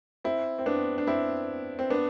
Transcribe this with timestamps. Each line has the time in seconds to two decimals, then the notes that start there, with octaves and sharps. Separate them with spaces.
0.24 C4 E4
0.59 C4
0.66 B3 D4
0.98 D4
1.07 C4 E4
1.79 C4
1.90 B3 D4